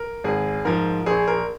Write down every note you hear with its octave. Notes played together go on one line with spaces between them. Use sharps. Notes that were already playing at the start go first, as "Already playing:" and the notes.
Already playing: A#4
G#1 G#4
G#2 F3 A#4
A#1 G#4
A#4